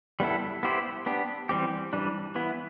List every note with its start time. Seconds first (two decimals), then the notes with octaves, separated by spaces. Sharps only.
0.20 G3 B3 E4 A4
0.63 B3 E4 G4 C5
1.06 B3 D4 G4
1.49 E3 G3 C4 G4
1.93 E3 G3 D4
2.35 E3 B3 E4